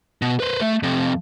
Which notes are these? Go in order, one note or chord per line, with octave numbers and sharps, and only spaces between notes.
B2
B4 C5
A3
F2 C3